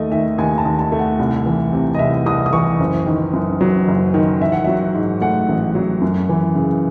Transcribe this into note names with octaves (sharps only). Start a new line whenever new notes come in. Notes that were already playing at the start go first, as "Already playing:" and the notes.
Already playing: D#2 A3 D#5
D#3 E5
D#2 G#5
A5
D#2
A5
A3
F#5
C2
E3
C3
D#5
C2 E5
C2 D#6
D#6
E3 C#6
F#1
D#3
F#2
F#3
F#1
D#3
A1 E5
F#5
F#3 E5
G#2
A3 F#5
A1
F#3
F#2
E3
C#3